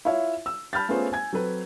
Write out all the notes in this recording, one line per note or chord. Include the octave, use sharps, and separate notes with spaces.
E4 F4 C#5 E5 F5
E6
A5 B5 F6 G6 A6
A3 B3 C#4 F4 G#4 C5
G#5 G#6
F#3 C4 A4 B4